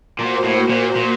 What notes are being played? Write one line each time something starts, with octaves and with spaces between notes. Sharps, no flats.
A#2 A#3 F#4 C5
A2
A#2
A#2